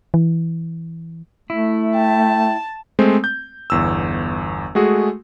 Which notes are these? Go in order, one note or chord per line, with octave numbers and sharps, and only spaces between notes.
E3
A3 E4
G5 A5
G#3 A3 C4 C5
G6
G1 E2 E6
G#3 A3 F#4 G#4